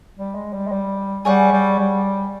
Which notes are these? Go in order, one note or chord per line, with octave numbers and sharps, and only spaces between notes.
G3
G#3
G3
G#3
G3
G3 G#4 C#5 F#5
G3
G3